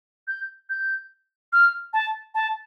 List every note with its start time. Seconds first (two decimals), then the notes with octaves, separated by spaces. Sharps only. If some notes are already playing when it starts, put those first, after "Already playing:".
0.28 G6
0.70 G6
1.53 F6
1.93 A5
2.35 A5